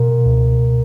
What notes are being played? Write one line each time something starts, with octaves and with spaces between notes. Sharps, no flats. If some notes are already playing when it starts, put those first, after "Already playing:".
Already playing: B2 A#4
C#2